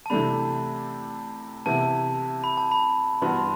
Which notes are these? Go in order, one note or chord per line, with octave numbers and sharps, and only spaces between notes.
A5
C3 E3 A3 D4 G4 B5
C3 E3 B3 E4 A5
B5
A5
B5
G2 E3 B3 F#4 C6
B5
C6